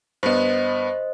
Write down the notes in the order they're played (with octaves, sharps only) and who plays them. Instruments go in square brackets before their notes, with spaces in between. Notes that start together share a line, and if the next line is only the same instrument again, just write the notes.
[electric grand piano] G2 B3 [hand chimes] C5 D#5